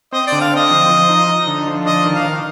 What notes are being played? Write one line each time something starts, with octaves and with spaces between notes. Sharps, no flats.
C4 D#5
D5
D3
F5
C4
D#5
F3
F3
D#4
D#4
D3
F3
D4 D#5
D#3
F5
D#3